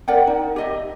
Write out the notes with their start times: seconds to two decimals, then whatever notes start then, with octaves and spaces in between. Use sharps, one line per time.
0.08 A#4 D5 F#5 G5
0.27 D#4
0.56 G4 D#5 E5